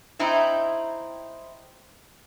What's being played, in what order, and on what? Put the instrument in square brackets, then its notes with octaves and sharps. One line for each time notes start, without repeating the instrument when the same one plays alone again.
[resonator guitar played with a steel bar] C4 D#4 E4